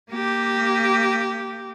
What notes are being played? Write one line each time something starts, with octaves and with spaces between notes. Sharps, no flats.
A#3 G4